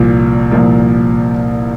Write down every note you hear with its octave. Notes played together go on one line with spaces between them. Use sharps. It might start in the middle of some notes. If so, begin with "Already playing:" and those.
Already playing: C2 A#2 F3 A#3
C2 A#2 F3 A#3